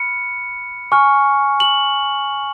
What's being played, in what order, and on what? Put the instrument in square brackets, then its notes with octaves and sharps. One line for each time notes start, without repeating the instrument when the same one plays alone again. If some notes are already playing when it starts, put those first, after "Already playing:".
Already playing: [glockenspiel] B5 F6 C#7
G#5 C#6 F6
F#7